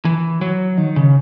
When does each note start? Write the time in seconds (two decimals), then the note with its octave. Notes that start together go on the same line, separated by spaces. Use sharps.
0.05 E3
0.41 F#3
0.78 D#3
0.96 C#3